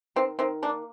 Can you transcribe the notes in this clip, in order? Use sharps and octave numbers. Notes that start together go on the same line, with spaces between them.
D#3 C4
D#3 C4
A#3 D4